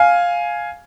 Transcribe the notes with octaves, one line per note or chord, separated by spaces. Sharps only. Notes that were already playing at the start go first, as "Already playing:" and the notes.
Already playing: F5 G#5